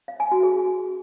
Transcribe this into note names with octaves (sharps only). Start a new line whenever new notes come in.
F5
G#5
F#4
G#4